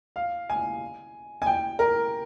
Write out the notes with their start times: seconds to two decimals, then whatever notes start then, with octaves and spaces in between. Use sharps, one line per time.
0.16 F5
0.50 G#5
1.42 G#5
1.46 G5
1.79 A#4